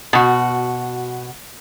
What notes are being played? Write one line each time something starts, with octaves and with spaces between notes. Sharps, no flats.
B2 F#4